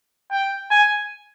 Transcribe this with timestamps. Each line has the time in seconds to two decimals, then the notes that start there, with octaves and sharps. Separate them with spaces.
0.32 G5
0.71 G#5